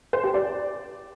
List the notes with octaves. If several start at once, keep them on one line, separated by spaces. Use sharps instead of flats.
C5
G4
D5